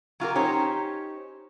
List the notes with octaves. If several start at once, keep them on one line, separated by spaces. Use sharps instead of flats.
F#3 F4 G4 A#4
C#4 D#4 G4 C5 C#5